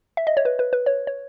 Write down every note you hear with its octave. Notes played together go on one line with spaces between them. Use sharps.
E5
D#5
C#5
B4
B4
B4
C#5
C#5